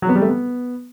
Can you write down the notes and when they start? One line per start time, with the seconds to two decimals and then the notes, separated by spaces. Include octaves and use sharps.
0.02 F#3
0.09 B3
0.15 G3
0.22 A3
0.28 B3